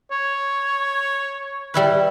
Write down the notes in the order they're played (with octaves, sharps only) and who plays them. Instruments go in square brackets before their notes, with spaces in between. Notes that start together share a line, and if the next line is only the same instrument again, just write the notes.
[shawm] C#5
[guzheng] G3 E4 B4